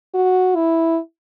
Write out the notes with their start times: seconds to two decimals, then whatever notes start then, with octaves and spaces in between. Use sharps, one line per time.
0.14 F#4
0.56 E4